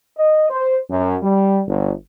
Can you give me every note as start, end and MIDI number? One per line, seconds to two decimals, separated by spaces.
0.18 0.47 75
0.50 0.79 72
0.90 1.16 42
1.23 1.61 55
1.67 1.91 31